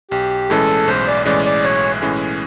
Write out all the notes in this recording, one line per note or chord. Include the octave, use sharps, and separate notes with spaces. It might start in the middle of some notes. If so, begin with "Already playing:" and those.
B1 G4
A2 E3 G#3 C#4 A4
B1 C5
D5
A2 E3 G#3 C#4 D5
D5
B1 C#5
A2 E3 G#3 C#4